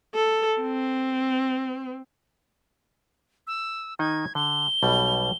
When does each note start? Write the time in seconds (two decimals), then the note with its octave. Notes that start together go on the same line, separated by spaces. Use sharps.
0.15 A4
0.62 C4
3.47 E6
3.99 D#3 D#4 D#5 G#6
4.35 D3 G7
4.83 B1 B2 G3